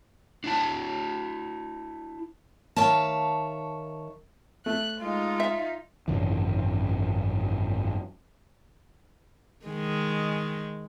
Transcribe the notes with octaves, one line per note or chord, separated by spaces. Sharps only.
D4 E4 A5
D#3 C#5 E5 F5 A5
A3 F#6
G#3 D#4 F4
E5
G#1 F#2 C#3 E3
D#3 G#3